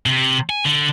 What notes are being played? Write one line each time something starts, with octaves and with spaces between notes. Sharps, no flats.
C3
G#5
D3